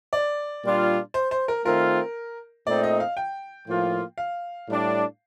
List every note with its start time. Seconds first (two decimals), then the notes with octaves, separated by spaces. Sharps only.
0.13 D5
0.64 A#2 G3 D4 F4
1.14 C5
1.31 C5
1.48 A#4
1.65 D#3 A3 C4 F4 A#4
2.66 A#2 A3 C4 D#4 D5
2.83 D#5
3.00 F5
3.17 G5
3.67 A2 F3 A#3 F4
4.18 F5
4.68 A2 G3 D4